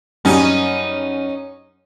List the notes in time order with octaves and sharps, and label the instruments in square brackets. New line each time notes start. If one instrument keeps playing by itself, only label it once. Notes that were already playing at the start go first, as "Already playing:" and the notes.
[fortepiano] F#2 G3 [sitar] C#4 D#4